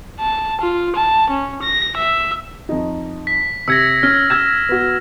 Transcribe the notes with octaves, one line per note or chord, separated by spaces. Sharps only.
A5
F4
A5
C#4
A#6
E5
F2 D#4
B6
C3 E6 G#6 A#6 C#7
C#4 F6
E6 G#6 A#6 E7
B3 F#4